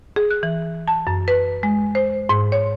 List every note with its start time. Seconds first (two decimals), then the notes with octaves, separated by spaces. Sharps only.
0.16 G#4
0.31 F#6
0.43 E3
0.88 A5
1.07 F#2
1.28 B4
1.63 G#3
1.95 C5
2.29 G#2
2.52 C#5